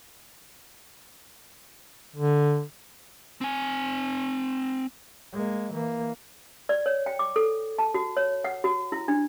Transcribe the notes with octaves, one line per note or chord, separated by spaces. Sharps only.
D3
C4 G#5
G#3 A#3
E3 A#3
D5
C#5
G5
D6
A4
A5
F#4
C#5
F#5
F#4
E4
D4